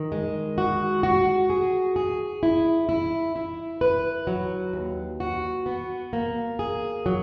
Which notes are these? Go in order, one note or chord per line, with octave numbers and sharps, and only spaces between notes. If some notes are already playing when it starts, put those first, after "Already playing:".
Already playing: D#3
G#3
F#4
F#4
G#4
G#4
E4
E4
E4
B4
F#3
D#2
F#4
B3
A#3
G#4
F#3